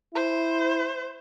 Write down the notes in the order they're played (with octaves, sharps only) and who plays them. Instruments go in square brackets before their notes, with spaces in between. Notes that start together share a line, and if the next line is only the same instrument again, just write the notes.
[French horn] E4 [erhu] C5